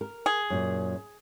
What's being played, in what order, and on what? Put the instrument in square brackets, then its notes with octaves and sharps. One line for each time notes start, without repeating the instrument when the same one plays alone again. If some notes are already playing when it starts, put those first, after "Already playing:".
[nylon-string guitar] A#4
[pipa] G#4
[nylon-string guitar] F#2 A#2